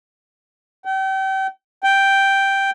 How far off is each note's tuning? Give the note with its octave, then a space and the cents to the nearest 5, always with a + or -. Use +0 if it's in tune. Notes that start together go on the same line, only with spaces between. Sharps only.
G5 -35
G5 +0